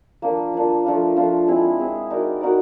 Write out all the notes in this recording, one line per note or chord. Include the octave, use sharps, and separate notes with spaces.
F3 A#3 D4
F3 A#3 D4
F3 A3 D4 F4
F3 A3 D4 F4
G#3 C4 E4 G#4
G#3 C4 E4 G#4
D#4 F#4 A#4 D5
D#4 F#4 A#4 D5